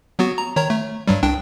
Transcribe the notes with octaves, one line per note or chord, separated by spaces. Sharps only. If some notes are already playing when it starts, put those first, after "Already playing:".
F#3 B3 F#4
A#5
D#3 C#5 A#5
A3
G2 F#3 G3
C2 D4 G5